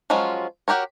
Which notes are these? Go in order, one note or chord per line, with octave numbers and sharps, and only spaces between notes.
F3 F#3 G#3 C#4 F4
F#4 G4 A#4 C#5